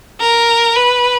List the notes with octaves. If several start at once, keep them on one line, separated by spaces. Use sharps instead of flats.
A#4
B4